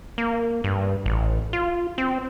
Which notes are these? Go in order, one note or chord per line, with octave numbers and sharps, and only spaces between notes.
A#3
G2
A1
F4
C4